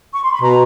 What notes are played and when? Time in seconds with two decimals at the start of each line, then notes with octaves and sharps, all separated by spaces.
0.12 C#6
0.22 C6
0.32 B5
0.42 B2 A#5